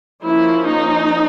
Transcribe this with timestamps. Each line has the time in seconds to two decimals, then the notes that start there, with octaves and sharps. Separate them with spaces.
0.25 F3 A#3 C#4 E4
0.69 D#4